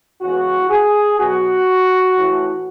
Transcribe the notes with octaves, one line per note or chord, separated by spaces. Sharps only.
C#3 E3 G#3 B3 F#4
G#4
B2 F#3 B3 F#4
A2 E3 A3